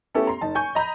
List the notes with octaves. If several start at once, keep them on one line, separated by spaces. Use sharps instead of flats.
A3 B3 C#4 E4 G4 A4
A#5 C6
F#1 D#4 A5
G#5 C#6 G6
D#5 A#5 B5 G6